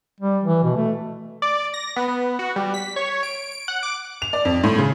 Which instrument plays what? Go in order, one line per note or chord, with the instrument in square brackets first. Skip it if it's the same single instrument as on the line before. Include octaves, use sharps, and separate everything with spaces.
[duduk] G3
E3
B2
A3
[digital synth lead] D5
A#6
B3
B3
F#4
G3
B6
C#5
D7
D7
F#5
D6
[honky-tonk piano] F7
D5
F2
A2
C#3